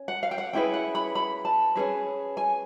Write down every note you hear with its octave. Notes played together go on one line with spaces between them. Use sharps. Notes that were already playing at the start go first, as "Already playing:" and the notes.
Already playing: C#4
F#5
F5
G5
F#5
C#4 E4 G#4 B4 G5
F#5
B5
B5
A5
C#4 E4 G#4 B4
G#5